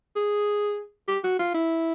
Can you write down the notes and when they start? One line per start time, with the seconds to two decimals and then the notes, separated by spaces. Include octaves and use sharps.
0.16 G#4
1.08 G4
1.24 F#4
1.39 F4
1.54 E4